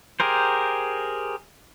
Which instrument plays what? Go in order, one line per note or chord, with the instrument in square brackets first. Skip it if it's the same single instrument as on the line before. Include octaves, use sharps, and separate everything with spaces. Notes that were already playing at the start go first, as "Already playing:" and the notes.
[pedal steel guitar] G4 G#4 A#4 C5